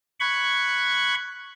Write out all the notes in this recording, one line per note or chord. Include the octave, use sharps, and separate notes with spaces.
B5 C#6 F#6 G#6